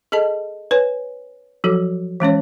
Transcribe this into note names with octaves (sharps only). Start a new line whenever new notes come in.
G#4 A4 D#5 A5
B4 C#5 G#5
F3 F#3 F#4 A4
E3 G#3 C#4 C#5